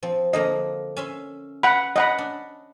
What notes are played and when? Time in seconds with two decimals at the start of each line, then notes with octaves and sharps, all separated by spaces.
0.03 F3 C4
0.33 D3 F3 A#3 D#5
0.97 C#4 E5 C6
1.63 F#5 B5
1.96 C#4 D#5 F#5 B5
2.18 D4